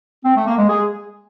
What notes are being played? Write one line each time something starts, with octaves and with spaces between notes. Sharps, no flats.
C4
A3
A#3
G#3
G#4